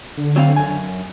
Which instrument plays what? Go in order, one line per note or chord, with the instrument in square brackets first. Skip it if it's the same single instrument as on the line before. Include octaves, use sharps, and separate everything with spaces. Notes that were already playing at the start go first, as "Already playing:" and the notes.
[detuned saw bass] D3
[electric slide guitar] F#3 C4 F5
F#2 G#5